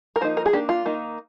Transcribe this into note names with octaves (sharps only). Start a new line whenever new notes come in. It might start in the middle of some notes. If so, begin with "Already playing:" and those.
A#4
F3 A#3 D#4 C5
A#4
G#4
D#3 A#3 D4 G4
F4
D#3 A#3 D#4